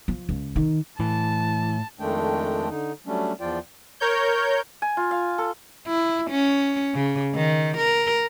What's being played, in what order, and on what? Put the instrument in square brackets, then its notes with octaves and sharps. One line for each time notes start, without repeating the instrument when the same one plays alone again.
[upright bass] F3
C#2
D#3
[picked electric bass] A2 [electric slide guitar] E3 [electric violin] A5
[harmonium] F2 D#3 G#3 A3 D4 G5
D3 D#4
F#3 G3 A3 C#4 D4
E2 F3 F4 D5 G5
[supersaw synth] A#4 C#5 G6
[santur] G#5
F4
F5
A4
[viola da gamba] E4
C#4
C#3
D#3
A#4